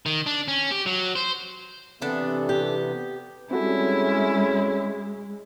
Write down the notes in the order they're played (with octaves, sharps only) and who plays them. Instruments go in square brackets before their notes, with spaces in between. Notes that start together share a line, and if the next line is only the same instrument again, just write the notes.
[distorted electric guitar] D#3
D4
C#4
G4
F#3
C5
[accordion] C3 E3 B3 [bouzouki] D4 A4 E5
[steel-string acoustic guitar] G4
[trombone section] G3 C#4 [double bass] G#3 [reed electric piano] C4 F#4 A4 [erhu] E4